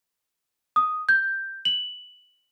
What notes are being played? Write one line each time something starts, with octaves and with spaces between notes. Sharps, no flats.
D#6
G6
F#7